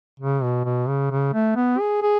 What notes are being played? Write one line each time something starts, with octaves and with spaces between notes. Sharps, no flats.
C#3
B2
B2
C#3
C#3
A3
B3
G#4
G#4